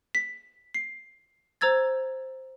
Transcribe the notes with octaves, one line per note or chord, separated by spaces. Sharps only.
B6
C7
C5 A#5 E6 G#6 A6